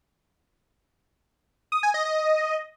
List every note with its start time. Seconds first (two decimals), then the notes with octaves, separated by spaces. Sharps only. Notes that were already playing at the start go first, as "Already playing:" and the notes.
1.72 D#6
1.83 G#5
1.94 D#5
2.05 D#5